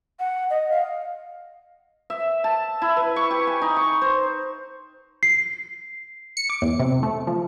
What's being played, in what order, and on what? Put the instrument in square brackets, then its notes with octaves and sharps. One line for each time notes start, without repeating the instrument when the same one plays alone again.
[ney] F#5
D#5
F5
[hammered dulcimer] E5
A5
E4
B4
C#6
G4
G#5
D#4
C#6
C5
[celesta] C7
[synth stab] C#7
D6
E2
C3
A3
F3